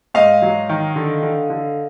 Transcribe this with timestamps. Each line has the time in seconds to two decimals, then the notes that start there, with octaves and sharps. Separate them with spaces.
0.14 G#2 D#5 F5
0.42 F#3
0.69 D#3
0.96 D3
1.23 D3
1.50 D3